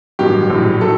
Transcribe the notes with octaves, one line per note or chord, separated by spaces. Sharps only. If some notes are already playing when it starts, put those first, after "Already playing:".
A1 G2 D#3 F#3 G4
A#1 A2 F#3
D#3 F#3 A4